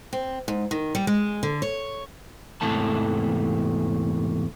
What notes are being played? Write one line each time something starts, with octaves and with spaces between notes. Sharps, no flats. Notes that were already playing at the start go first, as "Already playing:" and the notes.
C4
G#2
D#3
G3
G#3
D3
C#5
E2 G#2 C3 E3 A3 A5